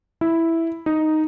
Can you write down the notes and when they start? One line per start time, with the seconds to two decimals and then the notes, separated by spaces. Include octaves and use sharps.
0.21 E4
0.86 D#4